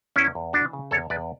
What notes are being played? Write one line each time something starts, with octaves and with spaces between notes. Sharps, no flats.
E2 C#4 E4
E2
E3 D4 F#4
C#3
E2 A4 C#5
E2 B4 D5